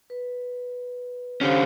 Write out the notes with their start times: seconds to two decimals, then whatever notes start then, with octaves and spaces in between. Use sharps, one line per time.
0.10 B4
1.41 D3 C#4 G4 C5 F5